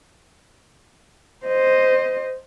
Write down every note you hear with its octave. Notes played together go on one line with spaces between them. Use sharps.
C5 D#5